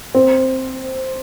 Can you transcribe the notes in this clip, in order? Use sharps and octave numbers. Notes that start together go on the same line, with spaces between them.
C4